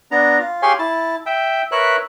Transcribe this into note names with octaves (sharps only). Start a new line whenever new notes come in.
B3 D4 A#5
F4
G4 G#4 C#5 F5 G#5 C6
E4 A5
E5 G5
A#4 B4 C#5 E5 F#6